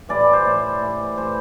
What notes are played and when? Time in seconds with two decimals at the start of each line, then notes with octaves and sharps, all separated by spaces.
0.09 A2 E3 G3 D5
0.20 D5
0.33 C5
0.45 A2 E3 G3 C5
0.80 A2 E3 G3
1.17 A2 E3 G3 C5